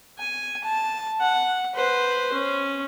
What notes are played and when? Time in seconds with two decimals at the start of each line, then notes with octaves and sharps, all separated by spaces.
0.18 G#5
0.64 A5
1.21 F#5
1.74 B4 C5
2.32 C#4